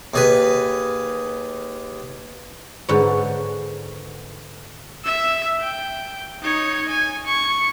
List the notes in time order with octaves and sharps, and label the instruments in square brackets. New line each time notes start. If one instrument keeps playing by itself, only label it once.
[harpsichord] D#2 G#4 B4
[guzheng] G#2 D3 B4 C#5
[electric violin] E5 E6
G5
D#4 C#5
G#5
C#6